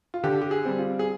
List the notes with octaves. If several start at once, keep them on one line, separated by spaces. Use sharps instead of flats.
F4
D3 G4
G4
G#4
G3 C4
F4
G#4